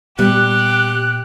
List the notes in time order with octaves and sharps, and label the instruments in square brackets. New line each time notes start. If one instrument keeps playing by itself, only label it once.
[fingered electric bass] A#2 B3 [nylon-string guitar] G3 [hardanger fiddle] G4 [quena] F#6